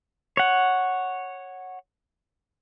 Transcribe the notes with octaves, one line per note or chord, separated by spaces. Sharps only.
C#5 F#5